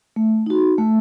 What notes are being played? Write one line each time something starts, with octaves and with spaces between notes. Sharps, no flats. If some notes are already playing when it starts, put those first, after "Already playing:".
A3
D#4 F#4
A3